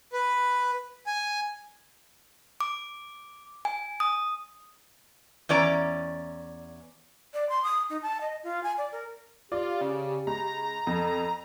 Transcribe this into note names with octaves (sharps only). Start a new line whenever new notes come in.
B4
G#5
D6
G#5
D#6
E2 C#4 D5 A#5
D5
C6
D#6
D#4
A5
D#5
F4
G#5
D5
A#4
F4 G4 D5
C#3
C#2 A#5
F2 A4